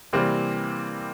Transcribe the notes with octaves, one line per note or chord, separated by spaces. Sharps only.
C3 E3 G3 A#3 C4